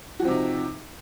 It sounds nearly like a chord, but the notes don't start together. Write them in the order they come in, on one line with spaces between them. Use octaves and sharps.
F#4 F3 C4 C3 D#4